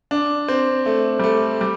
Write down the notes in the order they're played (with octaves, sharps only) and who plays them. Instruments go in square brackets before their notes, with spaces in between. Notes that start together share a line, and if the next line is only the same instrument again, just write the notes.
[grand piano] D4
C4
A3
G3
A3
G3